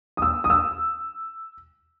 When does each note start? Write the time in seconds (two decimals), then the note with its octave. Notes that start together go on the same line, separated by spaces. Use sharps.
0.17 D#6
0.22 E6
0.44 D#6
0.50 E6